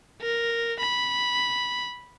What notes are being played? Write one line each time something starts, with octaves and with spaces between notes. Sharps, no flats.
A#4
B5